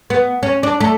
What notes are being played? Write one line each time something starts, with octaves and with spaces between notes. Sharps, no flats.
B3
C#4
D4
A3